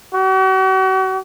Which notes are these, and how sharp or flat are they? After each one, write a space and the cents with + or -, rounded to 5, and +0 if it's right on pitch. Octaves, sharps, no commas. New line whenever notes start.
F#4 +40